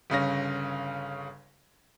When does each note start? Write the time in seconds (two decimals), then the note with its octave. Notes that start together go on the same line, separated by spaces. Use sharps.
0.10 G1 C#3 C#4 A#6